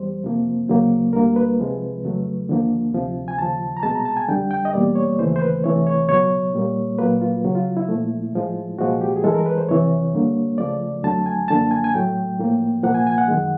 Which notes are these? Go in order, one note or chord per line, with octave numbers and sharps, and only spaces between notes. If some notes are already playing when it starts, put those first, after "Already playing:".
Already playing: E2 G3 C5
F2 C3 F3 A#3
D2 C#3 F#3 A#3
D2 D3 G3 A#3 A#4
B4
C2 C3 F3 G#3
F2 C#3 F#3 A3
D#2 D3 F3 A#3
D2 C3 F3
G#5
D#2 C#3 F3 A5
A#5
C2 B2 G#3 A5
A#5
A5
G#5
F2 D3 G3 G5
G5
D#5
E2 B2 G3 A#3 D5
C#5
D#2 C#3 E3 A3 C5
C5
B4
D2 C3 E3 A3 C#5
C#5
C#2 B2 F#3 C#5
A#2 G3 A#3
A#2 F#3 A#3 B4
F4
C#2 C#3 F#3
F4
E4
A#2 F3 A3
A2 F3 G#3
C2 A#2 F3 G#3 F#4
G4
G#4
G2 E3 G#3 A4
A#4
B4
C5
F2 C3 E3 C#5
G2 D3 G3 A#3
C#2 C#3 F3 A3 D5
F2 D3 F#3 A3 A5
G#5
F#2 D3 F3 A#3 A5
G#5
G#5
A2 F#3 A3 G5
A2 F3 A#3
C2 A#2 F3 A#3 F#5
G#5
G#5
F#5
F#2 D#3 G#3